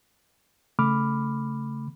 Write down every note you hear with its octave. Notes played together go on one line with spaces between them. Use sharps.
C#3 A3 B5 D6 F6